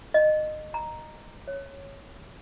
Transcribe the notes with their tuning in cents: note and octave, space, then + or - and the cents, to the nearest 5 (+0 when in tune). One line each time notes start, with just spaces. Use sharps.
D#5 -20
A#5 +0
C#5 -10